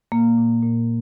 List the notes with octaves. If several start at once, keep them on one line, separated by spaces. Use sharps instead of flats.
A#2 A#3
A#2
A#2